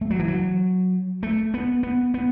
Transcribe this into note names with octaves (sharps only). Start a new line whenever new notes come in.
A3
F#3
E3
F#3
A3
B3
B3
B3